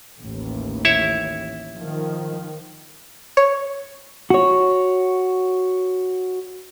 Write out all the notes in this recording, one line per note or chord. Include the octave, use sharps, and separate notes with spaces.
A1 D#2
E4 C#5 E5
D#3 F3
C#5
F#4 C#5